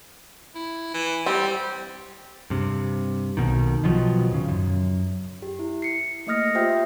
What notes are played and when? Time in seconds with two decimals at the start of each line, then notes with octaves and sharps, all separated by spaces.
0.55 E4
0.94 E3
1.26 G3 C4
2.50 G2 C3
3.37 B1 B2 D#3
3.84 B2 D#3 F3 F#3
4.30 D1 C#3
4.49 F#2
5.42 G4
5.59 E4
5.82 C7 C#7
6.27 A3 A#3 D#5 D#6 F6 A#6
6.55 F4 G4 C5 E5 G5